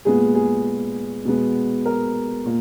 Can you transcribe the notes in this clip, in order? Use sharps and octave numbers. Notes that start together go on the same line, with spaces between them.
A#2 G#3 B3 G#4
G#4
B2 G#3 B3
A#4
A#2